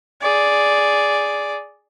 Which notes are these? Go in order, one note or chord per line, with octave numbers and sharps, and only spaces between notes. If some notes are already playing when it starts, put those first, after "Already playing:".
G#4 D5